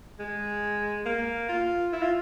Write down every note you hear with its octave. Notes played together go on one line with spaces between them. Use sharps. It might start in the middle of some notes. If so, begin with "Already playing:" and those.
G#3
A#3
F4
E4
F4